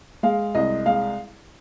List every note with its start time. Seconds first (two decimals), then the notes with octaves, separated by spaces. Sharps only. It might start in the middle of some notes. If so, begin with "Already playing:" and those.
0.23 G#3 F5
0.55 C2 D#5
0.86 G#3 F5